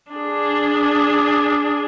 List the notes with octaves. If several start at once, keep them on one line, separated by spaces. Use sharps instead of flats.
D4 G#4